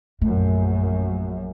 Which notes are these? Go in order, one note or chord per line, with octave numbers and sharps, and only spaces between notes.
A#1 F#2 A3